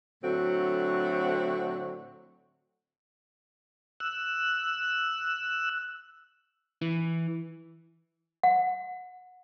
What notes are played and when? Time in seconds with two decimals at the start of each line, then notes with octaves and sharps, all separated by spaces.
0.23 A2 D3 F#3 A3 C4 F#4
4.00 E6 F#6
6.82 E3
8.44 F#5